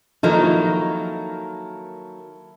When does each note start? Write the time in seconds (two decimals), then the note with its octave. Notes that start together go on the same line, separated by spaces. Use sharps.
0.23 D#3 F3 F#3 A#3 D#4 E4 A4